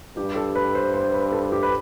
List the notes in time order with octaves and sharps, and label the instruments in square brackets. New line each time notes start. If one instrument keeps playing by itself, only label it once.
[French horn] G2 [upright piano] G4
[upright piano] A4
B4
C5
C5
B4
A4
G4
B4